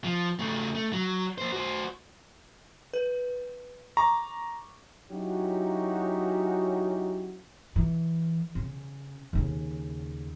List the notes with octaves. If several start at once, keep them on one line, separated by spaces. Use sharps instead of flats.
F3
C#3 A3
A3
F#3
A#3 C5
F#4 C5
B4
A#5 C#6 D6
F#3 C#4 D#4 E4 F#4 G4
E3
C#3
D#2 C#3